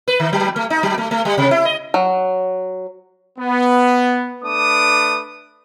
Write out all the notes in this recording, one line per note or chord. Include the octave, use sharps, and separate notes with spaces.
B4
D#3
F#3
A3
D#4
F#3
A3
A3
G3
C3
E4
D#5
F#3
B3
A3 D4 B4 D6 D#6